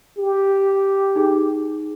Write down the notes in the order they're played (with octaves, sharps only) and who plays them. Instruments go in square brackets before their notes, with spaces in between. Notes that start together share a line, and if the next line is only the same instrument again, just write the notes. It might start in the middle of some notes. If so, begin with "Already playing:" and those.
[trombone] G4
[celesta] D#4 G#4